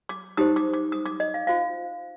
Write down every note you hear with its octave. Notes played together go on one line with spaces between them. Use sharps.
D6
D#4 G4 C5 D#6
D6
D6
D#6
D6
D#5
F5
F4 C5 F5